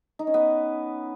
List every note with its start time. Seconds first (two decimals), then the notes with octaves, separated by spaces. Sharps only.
0.19 D#4
0.27 C#4
0.34 B3